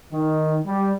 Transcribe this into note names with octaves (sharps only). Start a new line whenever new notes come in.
D#3
G3